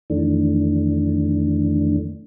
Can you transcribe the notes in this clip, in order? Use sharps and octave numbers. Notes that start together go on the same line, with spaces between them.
F2 D#3 E3 A3 D4